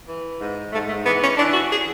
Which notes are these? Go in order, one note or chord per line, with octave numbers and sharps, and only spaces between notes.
E3
G#2
G#2 A3
A3
E3 B3
C#4
E3 D4
F#4
G#4